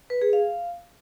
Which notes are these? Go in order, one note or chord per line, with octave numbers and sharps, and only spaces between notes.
B4
G#4
F5